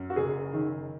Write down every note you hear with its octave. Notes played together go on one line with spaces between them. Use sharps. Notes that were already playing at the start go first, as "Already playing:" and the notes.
Already playing: F#2
F#4
F#1 G#4
D#3